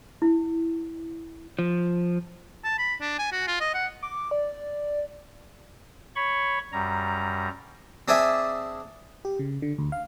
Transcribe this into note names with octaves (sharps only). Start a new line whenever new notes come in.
E4
F3
A5
B5
D4
G#5
F#4
F4
D#5
F#5
D6
D5
C#5 B5 C#6
F#2 G3 A#5
C4 D4 G#4 D5 E5
G4
C#3
D3
D2
F5